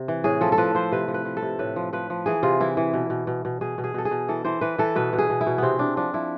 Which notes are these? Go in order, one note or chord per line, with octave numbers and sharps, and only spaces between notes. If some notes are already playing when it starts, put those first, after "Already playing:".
Already playing: C3
E3
A2 G#4
F3 A4
A4
F3 B4
F3 C5
C3 B4
F3
B4
F3
A4
C3
A2 B4
F3
F3 B4
F3
E3 G#4
C3 F4
E3 E4
E3
B2
B2
B2
B2
B2 G#4
B2
G#4
B2 A4
G#4
B2
E3 A4
E3 C5
E3 B4
E3 A4
B2 B4
B2
G#4
B2
E4
B2
C3 B3 C4
C3 D4
F3 D4
F3 E4